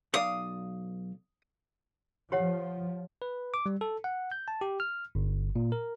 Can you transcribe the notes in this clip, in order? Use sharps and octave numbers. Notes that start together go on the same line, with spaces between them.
B1 D5 F5 D#6
F3 G4 C#5 F#5
B4
D6
G3
A4
F#5
G6
A5
G4
F6
G1
A#2
A#4